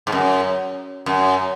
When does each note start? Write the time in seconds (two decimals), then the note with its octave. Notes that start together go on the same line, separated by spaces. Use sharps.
0.07 G#2
0.12 F#2
1.06 F#2